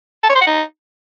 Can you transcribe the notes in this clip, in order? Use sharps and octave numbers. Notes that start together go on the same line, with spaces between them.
A5
C#5
C5
F#5
D#4